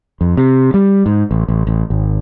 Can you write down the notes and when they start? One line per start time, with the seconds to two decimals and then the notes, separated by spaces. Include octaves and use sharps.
0.21 F2
0.37 C3
0.74 G3
1.06 G#2
1.31 A1
1.48 A1
1.67 A1
1.90 G#1